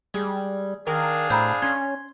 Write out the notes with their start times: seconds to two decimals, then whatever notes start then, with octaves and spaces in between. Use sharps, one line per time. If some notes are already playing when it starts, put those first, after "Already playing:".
0.14 G3 G#3
0.87 D#3 D4 G#4 A#4 F5
1.30 A2 C4 A#5 B5 G6
1.62 C#4 C6 G#6